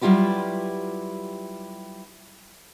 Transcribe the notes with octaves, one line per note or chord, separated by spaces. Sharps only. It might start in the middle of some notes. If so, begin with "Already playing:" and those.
F#3 G3 E4 F4 G4 B4